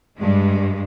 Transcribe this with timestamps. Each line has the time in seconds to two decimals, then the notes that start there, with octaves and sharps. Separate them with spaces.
0.19 G2 G#3